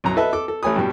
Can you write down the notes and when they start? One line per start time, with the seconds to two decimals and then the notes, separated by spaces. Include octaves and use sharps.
0.04 B1 F#2 A#5
0.17 A4 B4 D#5 E5 A5
0.33 A4 D6
0.48 A4
0.63 A1 A3 C#5 G#5 B5 D#6
0.76 G2 B2 G3